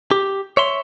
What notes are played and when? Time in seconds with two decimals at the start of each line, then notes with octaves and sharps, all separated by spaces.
0.11 G4
0.57 C#5 E5 C6